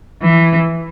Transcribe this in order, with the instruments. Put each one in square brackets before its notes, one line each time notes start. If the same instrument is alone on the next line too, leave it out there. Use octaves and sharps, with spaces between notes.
[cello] E3